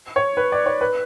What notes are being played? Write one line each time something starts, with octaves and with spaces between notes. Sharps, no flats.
C#5
B4
D5
C#5
B4